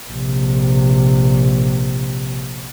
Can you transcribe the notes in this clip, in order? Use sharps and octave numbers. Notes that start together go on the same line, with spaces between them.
A#1 C3